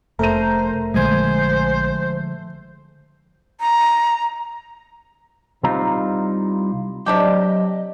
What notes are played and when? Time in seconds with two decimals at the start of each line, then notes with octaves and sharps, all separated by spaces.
0.19 F1 A3 A#4 C5 A#5 D#7
0.94 A#1 D3 F3 G#3 C5 G#5
3.60 A#5
5.63 C2 G3 C4 D#4 F4 A#5
7.06 C3 F#3 D4 G4 D5 D#5